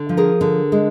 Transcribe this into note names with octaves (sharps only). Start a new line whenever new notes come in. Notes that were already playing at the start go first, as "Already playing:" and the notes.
Already playing: D3
F3
G#4 A#4
D3
G#3